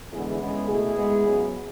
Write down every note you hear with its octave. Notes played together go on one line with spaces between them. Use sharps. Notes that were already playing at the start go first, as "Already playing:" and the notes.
E2 D3 G#3 B3 E4 G#4
C#3 G#3 B3
B2 A3 E4 G#4
G#2 G#3 B3
C#3 F#3 B3